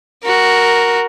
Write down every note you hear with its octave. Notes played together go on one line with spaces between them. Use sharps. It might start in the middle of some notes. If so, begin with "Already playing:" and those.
F#4 A#4